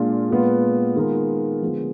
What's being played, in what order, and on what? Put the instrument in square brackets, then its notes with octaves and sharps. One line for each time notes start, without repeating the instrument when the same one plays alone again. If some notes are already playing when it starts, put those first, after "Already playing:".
Already playing: [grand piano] A#2 G#3 D4 F4
A#2 G#3 B3 F4 B4
D#3 G#3 B3 F4 A#4
D3 F3 G#3 B3